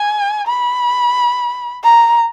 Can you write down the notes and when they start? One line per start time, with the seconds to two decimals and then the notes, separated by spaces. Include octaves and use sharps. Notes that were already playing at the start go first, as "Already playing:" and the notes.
Already playing: G#5
0.47 B5
1.84 A#5